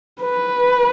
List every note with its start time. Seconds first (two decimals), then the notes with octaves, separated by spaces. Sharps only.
0.22 B4